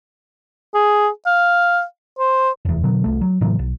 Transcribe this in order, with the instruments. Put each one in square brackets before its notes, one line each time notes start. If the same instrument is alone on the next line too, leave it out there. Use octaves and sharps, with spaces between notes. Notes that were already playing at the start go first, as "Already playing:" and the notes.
[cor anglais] G#4
F5
C5
[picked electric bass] F1 E2
B2 D3 F#3
C2 A3
F#3
A2 C#3 E3 F#3
B1